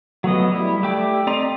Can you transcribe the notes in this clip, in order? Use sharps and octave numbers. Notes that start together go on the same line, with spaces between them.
F#3 A3 B3 D#5
G3 E4
A3 G4 D5
C4 D5 D#5 A#5 C6